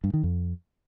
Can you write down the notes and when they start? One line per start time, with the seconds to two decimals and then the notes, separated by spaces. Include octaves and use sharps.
0.04 G2
0.14 D#3
0.23 F2